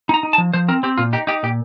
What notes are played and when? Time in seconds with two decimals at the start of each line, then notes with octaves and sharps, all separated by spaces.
0.09 D#4 A#5
0.23 D#4
0.33 A5
0.38 F3
0.53 F3 C5
0.68 C4 A#4
0.83 C4 G4
0.98 A#2 F4
1.13 D#4 G4
1.27 D#4 G4
1.43 A#2 G4